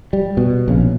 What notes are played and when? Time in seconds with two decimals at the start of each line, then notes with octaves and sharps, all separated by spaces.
0.13 G3
0.37 B2
0.68 A#1 C#3